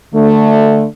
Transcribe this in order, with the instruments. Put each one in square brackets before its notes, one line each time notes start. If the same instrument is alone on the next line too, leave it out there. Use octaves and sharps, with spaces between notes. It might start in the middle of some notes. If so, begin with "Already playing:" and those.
[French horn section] D3 A3